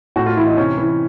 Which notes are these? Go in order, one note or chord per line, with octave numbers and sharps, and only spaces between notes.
A2 F#4
F4
E3 E4
D#4
C3 C#4
E3